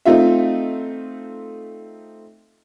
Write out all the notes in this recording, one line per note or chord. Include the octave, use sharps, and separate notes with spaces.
A3 C4 D#4 F4 E5